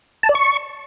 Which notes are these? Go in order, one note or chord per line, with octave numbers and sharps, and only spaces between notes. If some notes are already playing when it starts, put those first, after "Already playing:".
A5
D5
C#6